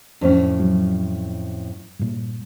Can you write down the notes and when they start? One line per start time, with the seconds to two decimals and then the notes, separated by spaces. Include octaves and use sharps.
0.21 F2 A2 C#4 D4
0.60 F#3
1.99 G2 A#2 G3